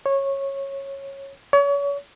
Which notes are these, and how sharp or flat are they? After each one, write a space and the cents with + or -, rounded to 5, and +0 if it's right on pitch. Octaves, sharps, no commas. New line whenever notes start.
C#5 -15
C#5 +35